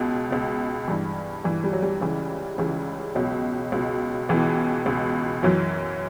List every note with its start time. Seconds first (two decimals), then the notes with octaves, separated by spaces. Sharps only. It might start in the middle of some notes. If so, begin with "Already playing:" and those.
Already playing: C#2 B2
0.31 C#2 B2
0.88 G2 E3
1.44 G2 E3
1.64 G3
1.73 F#3
1.82 G3
2.01 C#2 C#3 E3
2.58 C#2 C#3 E3
3.15 C#2 B2 F#3
3.72 C#2 B2
4.29 C#2 B2 E3
4.86 C#2 B2
5.43 F#2 E3 F#3